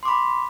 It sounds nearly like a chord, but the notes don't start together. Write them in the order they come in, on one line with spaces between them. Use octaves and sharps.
C6 D6 B5